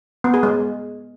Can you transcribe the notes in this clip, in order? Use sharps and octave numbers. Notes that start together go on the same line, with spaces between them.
B3
G#4
G#3